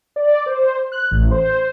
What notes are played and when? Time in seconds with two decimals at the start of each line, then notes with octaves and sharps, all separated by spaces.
0.16 D5
0.46 C5
0.92 F#6
1.11 A1
1.31 C5